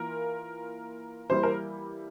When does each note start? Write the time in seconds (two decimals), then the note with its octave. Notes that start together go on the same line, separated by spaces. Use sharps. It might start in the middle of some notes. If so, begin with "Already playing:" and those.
Already playing: E3 A#3 F4 A#4
1.30 E3 G3 A#3 E4 C5
1.43 A#4